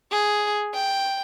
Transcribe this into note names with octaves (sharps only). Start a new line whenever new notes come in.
G#4
G5